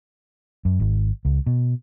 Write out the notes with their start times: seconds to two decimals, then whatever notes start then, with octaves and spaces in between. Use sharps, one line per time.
0.65 F#2
0.80 G#1
1.25 C#2
1.46 B2